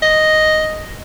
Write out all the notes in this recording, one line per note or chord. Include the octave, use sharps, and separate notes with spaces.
D#5